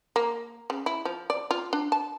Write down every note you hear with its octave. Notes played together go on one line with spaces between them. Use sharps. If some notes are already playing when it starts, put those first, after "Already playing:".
A#3
C#3
E4
F3
D5
F4
D4
A5